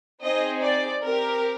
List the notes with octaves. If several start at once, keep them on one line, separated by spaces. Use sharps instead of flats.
C4 D#4 G#4 D#5
D5
C4 G4 A#4